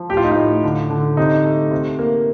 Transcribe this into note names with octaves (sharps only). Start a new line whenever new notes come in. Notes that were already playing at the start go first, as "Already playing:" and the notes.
Already playing: F3
A2 G4
F4
D#4
A2 F4
D3
D3
C3 D#4
A3
C3
A#3